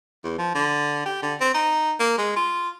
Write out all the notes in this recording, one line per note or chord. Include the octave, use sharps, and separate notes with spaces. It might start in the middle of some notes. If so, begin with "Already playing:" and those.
E2
F3
D3
G4
D3
C4
D#4
A#3
G#3
F4